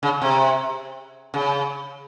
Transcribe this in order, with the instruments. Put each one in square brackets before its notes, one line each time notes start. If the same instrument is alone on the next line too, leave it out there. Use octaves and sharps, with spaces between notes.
[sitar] C#3
C3
C#3